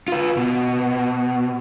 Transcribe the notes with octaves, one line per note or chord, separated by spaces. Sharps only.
F4 B4
B2